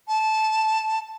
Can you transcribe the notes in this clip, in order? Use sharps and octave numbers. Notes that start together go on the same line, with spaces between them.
A5